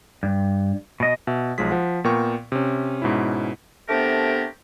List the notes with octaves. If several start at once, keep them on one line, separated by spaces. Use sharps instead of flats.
G2
B2 D#5
B2 E5
B1 F3 G#3 G#4 B6
F3 F#5
A#2 B3 A#4 G5 C#6
C3 C#4
G#2 B2 C#4 E4
C3 A3 B3 D4 G4 A#4